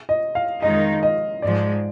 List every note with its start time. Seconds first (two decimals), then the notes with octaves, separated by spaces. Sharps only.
0.09 D#5
0.35 F5
0.62 F2 D#3 G#3 D#4 D#5
1.03 D#5
1.42 G#2 F3 G#3 D5